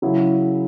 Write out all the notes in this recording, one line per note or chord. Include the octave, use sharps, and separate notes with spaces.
C#3 F#3 E4 G#4